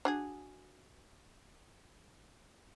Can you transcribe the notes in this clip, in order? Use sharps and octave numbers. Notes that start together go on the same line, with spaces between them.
D4 F#4 G#4